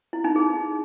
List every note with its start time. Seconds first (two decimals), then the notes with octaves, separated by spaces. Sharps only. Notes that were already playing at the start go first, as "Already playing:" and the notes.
0.13 E4
0.24 D#4
0.36 G#4